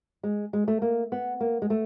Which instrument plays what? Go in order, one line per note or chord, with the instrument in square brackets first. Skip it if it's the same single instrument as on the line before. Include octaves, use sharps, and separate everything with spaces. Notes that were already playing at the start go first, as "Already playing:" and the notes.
[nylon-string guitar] G#3
G#3
A3
A#3
B3
A#3
G#3
A3